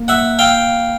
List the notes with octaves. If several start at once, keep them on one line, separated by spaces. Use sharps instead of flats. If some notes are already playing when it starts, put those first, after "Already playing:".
Already playing: A#3
E5 F#5
F5 G5